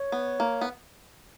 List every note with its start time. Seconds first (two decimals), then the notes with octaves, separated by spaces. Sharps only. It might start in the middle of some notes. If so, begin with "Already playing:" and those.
Already playing: C#5
0.12 B3
0.40 A#3
0.61 B3